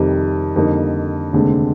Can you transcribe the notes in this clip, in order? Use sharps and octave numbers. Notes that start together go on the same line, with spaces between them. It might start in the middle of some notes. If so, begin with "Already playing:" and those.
Already playing: F2 C3 D#3 G3
F2 D3 G3 A#3 D#4
F1 D#2 D3 G#3 C4